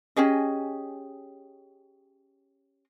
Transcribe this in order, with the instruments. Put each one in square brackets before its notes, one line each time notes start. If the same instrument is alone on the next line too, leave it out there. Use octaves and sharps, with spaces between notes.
[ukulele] C#4 G4 G#4 D#5